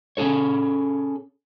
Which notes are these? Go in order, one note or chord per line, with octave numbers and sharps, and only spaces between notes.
C#4 D#4 G#4 A4 C#5